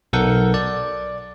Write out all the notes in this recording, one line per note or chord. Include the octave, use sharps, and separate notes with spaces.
B1 A4 A#4 F#5 G6
D5